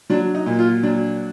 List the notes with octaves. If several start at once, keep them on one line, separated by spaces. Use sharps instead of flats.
F#3 D4
D#4
A#2
F4
F#3 D4